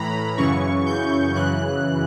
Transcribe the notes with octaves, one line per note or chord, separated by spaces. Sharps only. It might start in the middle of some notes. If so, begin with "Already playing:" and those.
Already playing: A2 E3 A#5 B5
F#2 C#3 E3 C#6
G6
F#2 C#3 E3 F#6